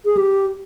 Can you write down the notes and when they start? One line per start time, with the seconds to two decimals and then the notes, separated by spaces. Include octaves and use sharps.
0.05 G#4
0.17 G4